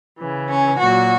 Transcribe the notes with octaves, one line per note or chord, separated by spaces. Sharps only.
C#3 E3
C#4
A#2 F#3 F#4